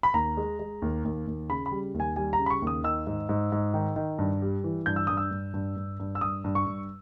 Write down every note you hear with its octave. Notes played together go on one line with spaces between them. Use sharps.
B5
D#2 A#5
G#3
G#3
D#2
D#2
D#2
C#3 B5
B5
G3
D#2
G#5
G3 G#5
A#5
C#3
B5
C#6
D#2
D#6
D#3 E6
G#2
G#2
G#2
D#3
D#3
G2
G3
E3
G2 G6
E6
G2 D#6
E6
G2
G2
G2
G2
E6
G2 D#6
G2
C#6
G2